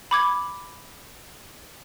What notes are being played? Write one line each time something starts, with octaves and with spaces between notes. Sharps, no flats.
B5 D6 G#6